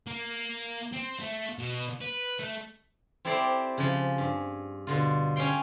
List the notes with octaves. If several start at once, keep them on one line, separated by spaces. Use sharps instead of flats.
A#3
C4
A3
B2
B4
A3
C4 E4 G4 A4 C5 D5
C#3 F3
G2
B2 D3 F4
C#4 G#4 C#5 G5 C6